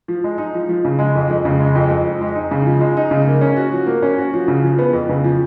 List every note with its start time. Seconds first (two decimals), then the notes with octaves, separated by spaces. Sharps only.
0.08 F3
0.24 G#3
0.38 D#4
0.54 F3
0.69 F3
0.85 C#3
0.99 G#3
1.15 F2
1.30 F2
1.45 C#3
1.59 G#3
1.75 F2
1.91 F2
2.05 F3
2.21 G#3
2.35 D#4
2.51 C#3
2.66 F3
2.81 G#3
2.97 D#4
3.11 C#3
3.27 A#3
3.41 C#4
3.56 F#4
3.73 F3
3.87 A#3
4.02 C#4
4.18 F#4
4.33 F3
4.48 C#3
4.63 F3
4.79 B3
4.93 F2
5.09 C#3
5.24 F3